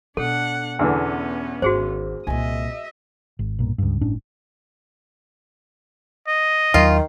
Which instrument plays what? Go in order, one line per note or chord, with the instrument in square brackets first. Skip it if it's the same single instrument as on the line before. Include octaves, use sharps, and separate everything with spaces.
[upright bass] B2 [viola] D4 F#5 [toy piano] A4
[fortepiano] E2 D3 E3 [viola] B3 C#4
[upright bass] G#1 [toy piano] F#4 G#4 C5
[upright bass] C2 A#2 [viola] D#5 E5 [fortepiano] G#5
[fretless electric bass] G#1
B1 G2 A#2
C#2 G2
G1 A2 C#4 D4
[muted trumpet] D#5
[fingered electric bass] D#2 F#3 [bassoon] D#3 [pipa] F4